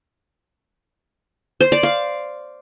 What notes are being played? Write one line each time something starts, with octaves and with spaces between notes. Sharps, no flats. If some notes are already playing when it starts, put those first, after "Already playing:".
C5
D5
F5